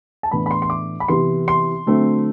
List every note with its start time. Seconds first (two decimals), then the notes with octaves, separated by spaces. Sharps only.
0.23 A5
0.31 A2 E3 B3 D4 B5
0.46 B5
0.51 C6
0.62 C6
0.70 D6
1.00 B5
1.08 C3 E3 B3 C6
1.48 C6
1.86 D3 F#3 A3 C4